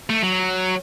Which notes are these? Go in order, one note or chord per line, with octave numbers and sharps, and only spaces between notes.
A3
F#3